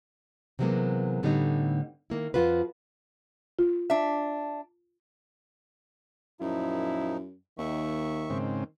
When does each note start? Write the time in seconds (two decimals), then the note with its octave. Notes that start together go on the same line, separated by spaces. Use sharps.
0.59 C3 E3 F#3 G#3 A#3 B3
1.23 A2 D3 G3 A3 B3 D#4
2.10 D#3 A#3 E4
2.34 F2 G#2 F3 F4 F#4 B4
3.59 F4
3.90 D4 E5
6.41 F#2 A#2 F3 D#4 E4
7.58 D#2 D#3 E5 C#6
8.30 G#2 C#3 C4